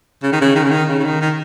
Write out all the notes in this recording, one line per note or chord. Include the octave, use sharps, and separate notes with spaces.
C#3
D#3
C#3
D#3
C#3
D#3
C#3
C#3
D#3
D#3